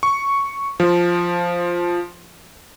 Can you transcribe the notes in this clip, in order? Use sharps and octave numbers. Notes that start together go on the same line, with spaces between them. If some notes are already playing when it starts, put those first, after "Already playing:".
C#6
F3